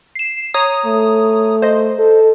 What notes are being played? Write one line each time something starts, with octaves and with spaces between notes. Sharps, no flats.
C7 E7
C#5 A#5 D#6
A3
C5 D#5
A4